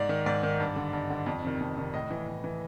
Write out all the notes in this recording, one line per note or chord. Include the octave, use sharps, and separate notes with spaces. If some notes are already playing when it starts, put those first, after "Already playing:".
Already playing: G#2 D5
D#3
G#2 D5
D#3
G2
D3
G2
D3
F2
C3 D#3
F2
C3 D#3
A2 D#5
E3
A2
E3